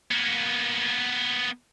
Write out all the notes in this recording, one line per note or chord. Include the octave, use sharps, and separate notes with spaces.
A#3 B3